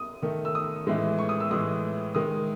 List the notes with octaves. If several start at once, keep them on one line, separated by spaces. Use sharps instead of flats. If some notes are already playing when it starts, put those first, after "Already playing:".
Already playing: D#6
D#3 A3
E6
D#6
A2 E3 G#3
C#6
D#6
E6
A2 E3 G#3 D#6
D#3 G#3 D#6